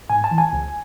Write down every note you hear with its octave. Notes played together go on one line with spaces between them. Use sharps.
G#2 G#5
A5
E3
G#5
C#2